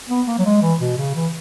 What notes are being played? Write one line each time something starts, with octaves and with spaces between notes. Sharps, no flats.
B3
A#3
F#3
G#3
E3
B2
C#3
E3